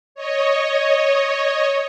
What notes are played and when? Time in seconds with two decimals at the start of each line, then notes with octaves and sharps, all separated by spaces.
0.15 C#5 D#5